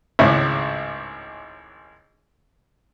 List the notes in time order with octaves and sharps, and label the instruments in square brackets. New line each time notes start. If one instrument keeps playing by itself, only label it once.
[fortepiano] G#1 C#2 A2